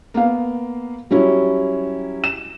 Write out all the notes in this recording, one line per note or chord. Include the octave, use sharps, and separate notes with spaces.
A#3 B3 F5
F#3 G3 C#4 E4
E7